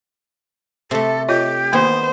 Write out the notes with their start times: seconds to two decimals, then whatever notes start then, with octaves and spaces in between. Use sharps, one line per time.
0.91 C3 A3 A4
1.28 F4 G4 C#5 D#5
1.73 D#3 A#3 B3 C5